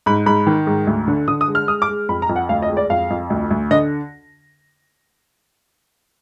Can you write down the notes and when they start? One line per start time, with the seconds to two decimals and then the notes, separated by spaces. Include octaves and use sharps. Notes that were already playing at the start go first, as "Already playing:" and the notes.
0.06 G#2 B5
0.26 G#2 B5
0.47 D#3
0.67 G#2
0.87 D2
1.08 D3
1.28 D3 D#6
1.41 D#6
1.48 G#3
1.55 F6
1.68 G#3 D#6
1.82 D6
1.88 G#3
2.09 F2 B5
2.22 A#5
2.29 F2
2.36 F#5
2.49 D2 F5
2.62 D#5
2.70 G#3
2.77 D5
2.90 F2 F5
3.10 F2
3.30 D2
3.51 D2
3.71 D3 D#5